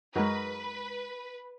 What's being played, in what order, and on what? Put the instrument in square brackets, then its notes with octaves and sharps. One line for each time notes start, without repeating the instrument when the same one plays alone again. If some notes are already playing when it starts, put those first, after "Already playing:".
[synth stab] F#2 G#3 [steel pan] D#4 F#4 A#4 [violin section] B4